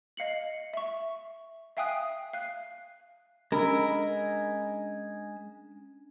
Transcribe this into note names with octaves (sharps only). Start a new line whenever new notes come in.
D#5 F5 C#7 F#7
E5 C#6
E5 F5 G5 G#5 D#6 F#6
F5 F#6
G#3 C#4 D4 A#4 B5 E6